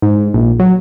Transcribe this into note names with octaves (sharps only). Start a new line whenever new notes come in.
G#2
A#1
F#3